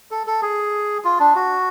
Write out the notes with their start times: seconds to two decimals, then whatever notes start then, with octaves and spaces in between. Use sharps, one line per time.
0.11 A4
0.27 A4
0.42 G#4
1.05 F4
1.20 D4
1.35 F#4